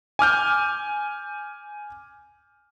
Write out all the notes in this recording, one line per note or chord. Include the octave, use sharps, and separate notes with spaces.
G#5 D6 F6 G6